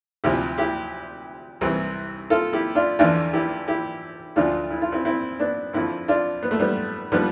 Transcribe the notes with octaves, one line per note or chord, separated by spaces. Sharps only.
D2 C3 F3 E4 G4
E4 G4
C2 C3 E3
F4 A4
E4 G4
D4 F4
E2 D3 F3 D4 F4
E4 G4
E4 G4
D2 D3 F3 D4 F4
E4
F4
C4 E4
C4 E4
B3 D4
F2 D3 F3 C4 E4
D4 F4
B3
A3
G3 B3
D3 F3 G3 B3